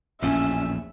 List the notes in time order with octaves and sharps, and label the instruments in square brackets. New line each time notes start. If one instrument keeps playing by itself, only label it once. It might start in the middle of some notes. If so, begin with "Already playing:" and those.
[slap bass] A#1 E2 A2 [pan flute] C#4 [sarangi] E5